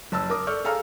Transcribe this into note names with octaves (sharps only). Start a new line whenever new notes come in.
F#1 A5 E6
A#4 D6 D#6
A4 D5 C#6 F6 G6
G#4 A4 F5 A#5 F6